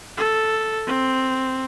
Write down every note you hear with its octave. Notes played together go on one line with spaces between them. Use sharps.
A4
C4